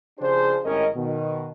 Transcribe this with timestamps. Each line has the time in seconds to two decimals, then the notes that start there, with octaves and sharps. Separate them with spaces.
0.19 C#3 F3 D4 G4 G#4 C5
0.63 G#1 A2 C#4 G4 A#4 D#5
0.94 B2 D#3